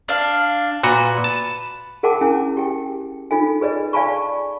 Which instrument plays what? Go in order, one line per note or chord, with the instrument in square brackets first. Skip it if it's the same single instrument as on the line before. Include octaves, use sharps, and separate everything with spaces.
[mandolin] D4 F5
[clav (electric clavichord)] A#2 F#4 [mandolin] B4
[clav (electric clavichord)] A5
[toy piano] G#4 A#4 F#5 G5 A5 D6
C#4 E4 G#5
G4 G5
D#4 F4 A4 G#5
G#4 B4 D5 D#5
D5 F5 G#5 A5 B5 C#6